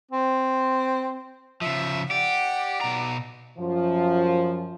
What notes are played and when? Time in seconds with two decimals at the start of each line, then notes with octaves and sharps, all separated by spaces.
0.11 C4
1.61 C#3 F3 E5
2.11 G4 D5 F#5
2.81 B2 A#5
3.58 F#2 F3